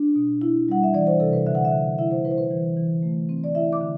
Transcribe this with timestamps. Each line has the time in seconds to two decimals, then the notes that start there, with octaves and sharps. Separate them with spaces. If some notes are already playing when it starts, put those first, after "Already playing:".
Already playing: D4
0.16 B2
0.42 E4
0.68 G3 F#5
0.83 E5
0.94 E3 D5
1.07 C5
1.20 C3 A4
1.33 B4
1.46 D3 E5
1.55 F#5
1.65 E5
1.72 D3
1.98 E4 E5
2.11 C5
2.25 E4 B4
2.31 C5
2.38 B4
2.51 E3 C5
2.77 E3
3.03 A3
3.29 C4
3.44 D5
3.55 E4 E5
3.73 D6
3.81 D3